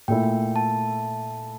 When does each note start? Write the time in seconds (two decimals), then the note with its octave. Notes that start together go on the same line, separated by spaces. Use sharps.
0.08 A#2 A3 E4 G5
0.56 A5